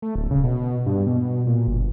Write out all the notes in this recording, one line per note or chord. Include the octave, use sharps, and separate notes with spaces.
A3
D1
C#3
B2
G2
B2
A#2
G1